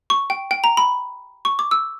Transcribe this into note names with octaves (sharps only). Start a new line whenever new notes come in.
C#6
G5
G5
A#5
B5
C#6
D6
E6